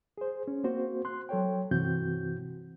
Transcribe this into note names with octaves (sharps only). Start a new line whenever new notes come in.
G#4 C5
C#4
A#3 C4 F#4 C5
C6 F#6
F#3 A4 C#5 G5
G2 C3 E3 C4 F#4 G6